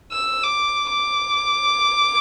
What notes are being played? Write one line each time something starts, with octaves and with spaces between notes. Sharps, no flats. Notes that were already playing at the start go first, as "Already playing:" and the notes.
E6
D6
D6